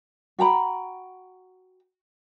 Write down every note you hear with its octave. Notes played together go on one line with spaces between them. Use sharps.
F#4 G5 A#5 B5